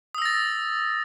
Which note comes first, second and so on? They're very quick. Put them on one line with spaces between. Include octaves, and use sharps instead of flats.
D#6 E6 A#6 A6